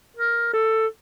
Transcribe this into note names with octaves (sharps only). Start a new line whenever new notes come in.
A#4
A4